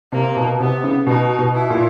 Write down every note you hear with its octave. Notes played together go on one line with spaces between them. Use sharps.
C3 A#3
B2
C3 B3
C#3
B2 D#4
B2
E4
A#2